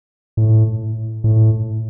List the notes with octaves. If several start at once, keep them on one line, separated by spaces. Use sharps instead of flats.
A2
A2